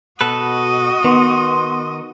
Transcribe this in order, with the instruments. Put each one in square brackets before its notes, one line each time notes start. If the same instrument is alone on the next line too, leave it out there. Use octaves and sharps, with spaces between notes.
[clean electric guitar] B2 A4 B4 [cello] F#4 D#5
[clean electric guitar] D#3 [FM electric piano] B3 [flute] C6